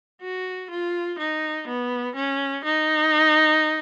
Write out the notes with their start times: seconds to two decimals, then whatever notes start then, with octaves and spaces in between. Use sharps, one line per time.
0.22 F#4
0.70 F4
1.19 D#4
1.68 B3
2.16 C#4
2.64 D#4